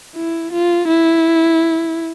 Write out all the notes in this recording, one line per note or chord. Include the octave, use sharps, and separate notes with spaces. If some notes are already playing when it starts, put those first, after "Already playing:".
E4
F4
E4